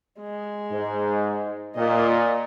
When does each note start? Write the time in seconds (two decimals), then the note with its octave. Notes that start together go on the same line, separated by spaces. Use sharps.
0.20 G#3
0.70 G#2
1.76 A#2 D#5